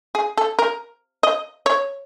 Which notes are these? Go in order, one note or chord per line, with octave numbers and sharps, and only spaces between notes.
G#4
A4
A#4
D#5
C#5